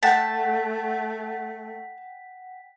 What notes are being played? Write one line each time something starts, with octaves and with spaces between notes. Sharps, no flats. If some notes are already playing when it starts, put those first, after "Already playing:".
A3 F#5 G5 A5 B6